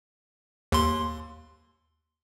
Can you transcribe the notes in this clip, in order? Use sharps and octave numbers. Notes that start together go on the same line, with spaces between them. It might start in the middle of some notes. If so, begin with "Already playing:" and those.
D#2 C6